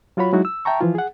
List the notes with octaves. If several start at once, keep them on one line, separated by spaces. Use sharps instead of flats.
F#3 F4 F#4 C#5 B5
F#3 G#3 D#4 E4 F#4
E6
E5 G5 A5 A#5 C#6
E3 F3 E4 F4
G#4 F#5